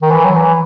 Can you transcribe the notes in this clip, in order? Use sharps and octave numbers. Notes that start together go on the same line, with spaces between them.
D#3
E3
F#3
E3